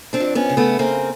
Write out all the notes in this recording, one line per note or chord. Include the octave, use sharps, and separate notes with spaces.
C4 D4
F2
B3 C#4
C#3
A3 B3
C#3 A#3 C4